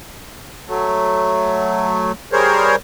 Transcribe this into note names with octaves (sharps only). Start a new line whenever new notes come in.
F#3 A3
G3 G#4 A#4 C5 C#5